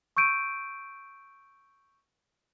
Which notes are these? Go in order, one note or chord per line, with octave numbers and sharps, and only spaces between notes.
C#6 E6 G6 D7 D#7